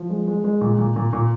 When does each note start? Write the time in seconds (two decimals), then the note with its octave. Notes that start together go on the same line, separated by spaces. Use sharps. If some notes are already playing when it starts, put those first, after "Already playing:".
Already playing: F3
0.10 G#3
0.27 G#3
0.44 G#3
0.61 A#2
0.78 A#2
0.96 A#2
1.13 A#2